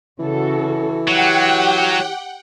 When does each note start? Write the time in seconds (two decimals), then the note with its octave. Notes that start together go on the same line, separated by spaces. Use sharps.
0.19 C#3 E3 F#4 A4
1.08 F#3 G4 F#5 G5